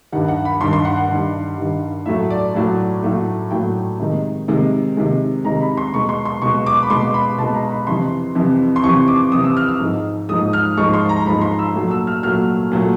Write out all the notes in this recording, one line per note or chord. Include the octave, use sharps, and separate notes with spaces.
G2 D#3 G3 F#5
F#5
B5
G2 D#3 G3 C6
C6
F#5
F#5
G2 D#3 G3
G2 D#3 G3
A2 F#3 A3 E5
D5
A2 F#3 A3
A2 F#3 A3
A2 F#3 A3 G5
C3 D#3 G#3
C3 D#3 G#3
C3 D#3 G#3
C3 D#3 G#3 A#5
B5
C6
B2 G#3 C#6
C6
C6
B2 G#3 C#6
D6
B5
B2 G#3 C6
B5
B2 G#3 A5
A#5
B5
F2 C3 E3 C6
F2 C3 E3
C6
F2 C3 E3 C#6
D6
F2 C3 E3 D#6
E6
F6
E6
G#2 F3 G#3
G#2 F3 G#3 D#6
F6
G#2 F3 G#3 C#6
C6
A#5
G#2 F3 G#3 B5
C6
E6
A#2 F#3 A3
E6
F6
A#2 F#3 A3 F6
A#2 F#3 A3